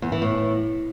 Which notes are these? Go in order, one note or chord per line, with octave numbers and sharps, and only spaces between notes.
E2
E3
A2